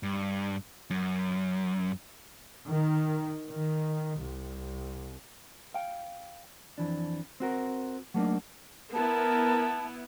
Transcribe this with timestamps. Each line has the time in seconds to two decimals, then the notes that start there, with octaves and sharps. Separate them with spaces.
0.03 G2
0.90 F#2
2.69 D#3
3.51 D#3
4.20 C2
5.74 F5 G5
6.78 F2 E3 D4
7.40 C4 F#4 A#4
8.14 F#3 A3 A#3 D4 D#4
8.94 B3 E4 A#4 A5